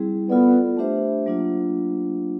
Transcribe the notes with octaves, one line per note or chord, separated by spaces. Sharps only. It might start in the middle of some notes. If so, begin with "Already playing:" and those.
Already playing: G3 C4 E4 G#4
B3 F4 A4 D5
A3 D4 G4 C5 E5
F#3 A#3 D4 F4